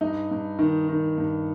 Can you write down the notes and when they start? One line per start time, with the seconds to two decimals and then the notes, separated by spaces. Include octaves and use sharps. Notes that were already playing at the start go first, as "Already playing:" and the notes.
0.01 G2 D#4
0.31 G2
0.59 D#3
0.89 D#3
1.18 G2